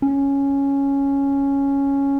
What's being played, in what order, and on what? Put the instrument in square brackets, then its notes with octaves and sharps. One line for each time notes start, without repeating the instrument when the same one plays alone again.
[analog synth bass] C#4